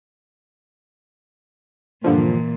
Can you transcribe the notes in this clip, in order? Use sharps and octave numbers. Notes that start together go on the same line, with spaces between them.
G2 A#2 D3 E3 F3